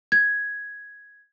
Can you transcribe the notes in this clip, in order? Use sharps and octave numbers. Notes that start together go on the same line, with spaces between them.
G#6